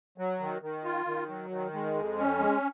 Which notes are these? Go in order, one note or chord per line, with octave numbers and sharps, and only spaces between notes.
F#3
D#3
D#3
F4
D#3
F#3
D#3
G#3
F2
C#4
G#3